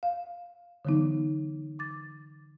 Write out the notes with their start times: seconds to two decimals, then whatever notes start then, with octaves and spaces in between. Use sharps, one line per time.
0.03 F5
0.85 D3 E3 F#3 B3 D#4
1.79 D6 A6